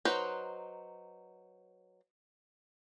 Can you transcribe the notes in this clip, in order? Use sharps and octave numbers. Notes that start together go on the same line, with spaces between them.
F#3 D#4 B4 C5